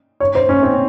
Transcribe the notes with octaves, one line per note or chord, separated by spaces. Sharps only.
C#5
C5
C#4
C4